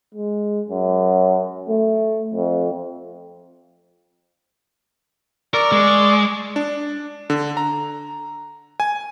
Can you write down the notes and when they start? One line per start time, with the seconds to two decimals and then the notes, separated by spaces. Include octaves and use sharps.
0.15 G#3
0.69 F#2
1.69 A3
2.34 F2
5.54 A#4 D5 C#6 E6
5.72 G#3
6.56 D4
7.30 D3
7.57 A#5
8.80 G#5